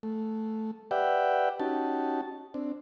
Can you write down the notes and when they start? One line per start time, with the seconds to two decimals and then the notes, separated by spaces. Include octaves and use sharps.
0.03 A3
0.91 G4 B4 D5 E5 F#5 G5
1.60 C#4 D#4 F#4 G4 A5
2.54 C4 D4